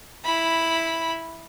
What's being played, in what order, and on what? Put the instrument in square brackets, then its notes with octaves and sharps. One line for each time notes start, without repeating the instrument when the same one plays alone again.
[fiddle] E4 B5